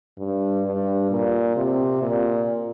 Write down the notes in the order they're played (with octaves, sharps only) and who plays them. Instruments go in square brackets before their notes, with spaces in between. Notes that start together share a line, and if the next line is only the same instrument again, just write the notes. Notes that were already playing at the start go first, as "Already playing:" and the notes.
[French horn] G2
G2
A#2
C3
A#2